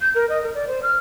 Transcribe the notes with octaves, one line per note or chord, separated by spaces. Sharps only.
G6
A#4
D#5
A#4
D5
C5
F6